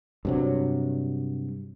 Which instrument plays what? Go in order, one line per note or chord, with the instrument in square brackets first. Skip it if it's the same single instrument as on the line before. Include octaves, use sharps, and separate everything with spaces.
[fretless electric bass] G2 C3 F#3